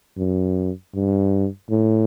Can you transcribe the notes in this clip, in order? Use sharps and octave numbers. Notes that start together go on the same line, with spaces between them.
F#2
G2
A2